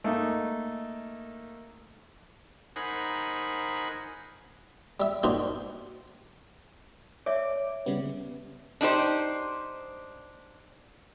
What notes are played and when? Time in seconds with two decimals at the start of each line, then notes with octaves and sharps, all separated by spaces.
0.04 A3 A#3 D#4
2.76 D#4 A#4 C5 F#5 G#5 B5
5.00 G3 E5
5.23 A#2 G3 D4 D#4 F#4 C5
7.26 C#5 D5 E5 D6
7.86 C#3 G3 B3
8.81 D4 D#4 G4 C5